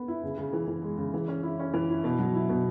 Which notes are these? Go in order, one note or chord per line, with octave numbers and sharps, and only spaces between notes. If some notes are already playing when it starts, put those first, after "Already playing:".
Already playing: B3
E4
C#3
C#3
E3
E3
G#3
C#3
E3
C#4
E4
C#4
E3
E4
B2
F#3
E4
B2